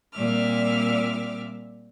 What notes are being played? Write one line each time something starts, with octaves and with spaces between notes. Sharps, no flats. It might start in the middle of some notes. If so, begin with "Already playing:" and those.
A#2 G3 C4 E5 D6 F6